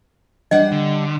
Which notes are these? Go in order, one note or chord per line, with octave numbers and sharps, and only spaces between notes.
G3 D4 D#5 F#5
D3